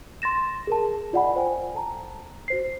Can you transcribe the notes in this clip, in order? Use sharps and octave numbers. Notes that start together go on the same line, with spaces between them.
C6 A6 A#6 E7
G#4 A#4 A5
F4 D5 D#5 F#5 G#5 B5
C5 G5 G#5
A4 A5 A#5
F#4 C5 C7